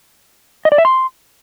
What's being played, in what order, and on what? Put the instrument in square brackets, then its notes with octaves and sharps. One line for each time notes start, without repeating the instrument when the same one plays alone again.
[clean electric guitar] D#5
D5
E5
C6